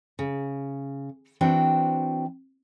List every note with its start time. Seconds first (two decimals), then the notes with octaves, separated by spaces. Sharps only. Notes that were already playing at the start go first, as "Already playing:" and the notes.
0.19 C#3
1.41 E3 C4 D4 F#4 C5 G5